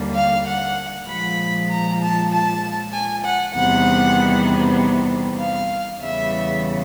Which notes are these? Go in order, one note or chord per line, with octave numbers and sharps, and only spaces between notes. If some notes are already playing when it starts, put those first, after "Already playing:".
Already playing: D#2 D3 G3 A#3
F5
F#5
A#2 F3 G#3 B5
A#5
A5
A5
G#5
F#5
E2 C3 D#3 G3 B3 F#5
F5
E2 C#3 E3 G3 B3 E5